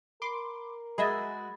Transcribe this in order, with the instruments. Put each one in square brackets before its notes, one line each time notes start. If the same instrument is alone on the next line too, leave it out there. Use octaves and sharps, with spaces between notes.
[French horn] A#4 [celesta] B5 [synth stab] C6 D6
[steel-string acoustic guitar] G#3 F#4 [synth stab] G#4 D#5 E5 [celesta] B5 G#6 A6